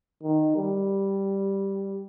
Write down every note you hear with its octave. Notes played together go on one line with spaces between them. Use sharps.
D#3
G3